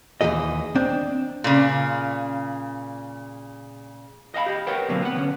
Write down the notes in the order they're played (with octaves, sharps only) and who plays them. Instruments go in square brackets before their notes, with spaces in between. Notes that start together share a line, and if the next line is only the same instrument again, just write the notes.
[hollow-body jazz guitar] D#2 A#2 E3 G#4 D#5
C4 D4
[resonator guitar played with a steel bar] A#2 C#3
[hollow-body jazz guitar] D#5 F5 F#5 B5
G4 D#5
A#4 B4 C#5 F#5 G5
B2 D3 F#3 A#3 C4
B3 F#5
D3 C#4